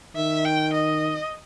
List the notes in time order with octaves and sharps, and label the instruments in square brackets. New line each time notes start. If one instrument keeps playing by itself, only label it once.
[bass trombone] D#3 [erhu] E5
[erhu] G5
D#5